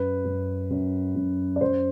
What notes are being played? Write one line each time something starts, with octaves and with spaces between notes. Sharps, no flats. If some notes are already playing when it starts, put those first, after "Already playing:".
Already playing: F#2 B4
F#2
F#2
F#2
D5
F#2 C5